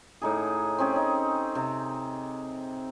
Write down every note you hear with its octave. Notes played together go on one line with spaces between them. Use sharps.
A2 D#4 G#4
C4 C#4 G4 G#4
D#4
C3